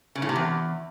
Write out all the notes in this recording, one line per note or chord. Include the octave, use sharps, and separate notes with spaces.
C#3
A2
C3
E2